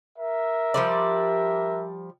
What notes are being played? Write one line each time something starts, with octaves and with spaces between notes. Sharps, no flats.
A#4 E5
F3 G3 D5